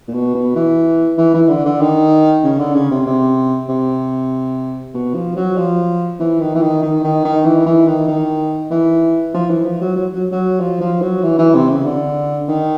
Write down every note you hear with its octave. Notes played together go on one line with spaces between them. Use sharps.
A#2
B2
B2
E3
E3
E3
D3
D3
D#3
C#3
D3
C#3
C3
C3
C3
B2
F3
F#3
F3
E3
D#3
E3
D#3
D#3
D#3
D#3
E3
E3
D#3
D#3
E3
F3
E3
F3
F#3
F#3
F#3
F#3
F3
F3
F#3
E3
E3
C3
C#3
D3
D#3